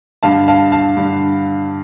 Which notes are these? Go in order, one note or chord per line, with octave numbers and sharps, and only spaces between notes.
G2 D3 F5 A5
F5 A5
F5 A5
G2 D3